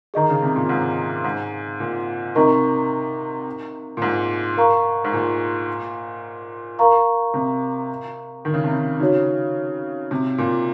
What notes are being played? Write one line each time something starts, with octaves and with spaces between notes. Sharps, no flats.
D#3 G#4 D#5 A#5
C#3
C3
A#2
G#2
G#2
A#2
C3 D#4 A#4 D#5 A#5 C#6
A#2
G#2
A#4 F5 A#5 C#6
G#2
A#2
A#4 F5 A#5 C#6
C3
D#3
C#3
C3
C#3
C#3 D#4 F#4 C#5
C3
A#2